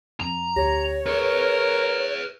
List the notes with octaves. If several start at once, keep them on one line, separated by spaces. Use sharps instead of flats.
F2 A#5
D2 G4 C#5 A#6
G#4 A#4 B4 C#6 F#6 C#7